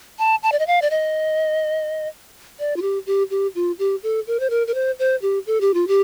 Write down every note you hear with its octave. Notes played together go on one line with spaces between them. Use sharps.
A5
A5
D5
D#5
F5
D5
D#5
D5
F4
G4
G4
G4
F4
G4
A4
A#4
C5
A#4
A#4
C5
C5
G4
A4
G4
F4
G4